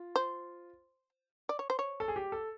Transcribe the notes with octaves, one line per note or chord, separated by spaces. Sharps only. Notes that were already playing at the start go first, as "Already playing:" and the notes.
Already playing: F4
C5
D5
C#5
C5
C#5
A4
G#4
G4
A4